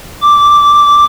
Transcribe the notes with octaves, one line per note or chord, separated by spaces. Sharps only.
D6